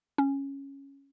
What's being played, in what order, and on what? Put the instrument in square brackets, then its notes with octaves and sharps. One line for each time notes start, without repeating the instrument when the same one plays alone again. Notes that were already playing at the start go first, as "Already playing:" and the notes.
[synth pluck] C#4